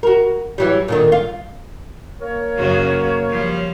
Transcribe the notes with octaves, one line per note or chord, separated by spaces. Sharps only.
F#4 A#4
E3 F#3 G3
A#2 D3 D#3
F4
A#3 A#4 C#5
F#2 C#3 F#4
F3 G3